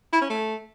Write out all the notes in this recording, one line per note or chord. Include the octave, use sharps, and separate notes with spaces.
E4
C#4
A3